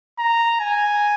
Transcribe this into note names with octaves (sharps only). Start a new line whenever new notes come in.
A#5
G#5